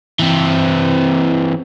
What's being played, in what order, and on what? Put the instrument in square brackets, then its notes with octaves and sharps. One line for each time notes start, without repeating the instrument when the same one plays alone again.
[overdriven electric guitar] E3 C4